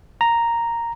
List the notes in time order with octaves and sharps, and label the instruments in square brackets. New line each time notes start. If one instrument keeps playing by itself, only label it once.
[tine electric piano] A#5